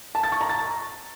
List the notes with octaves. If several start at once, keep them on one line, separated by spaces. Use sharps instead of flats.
A5
A6
C#6
A#5
A6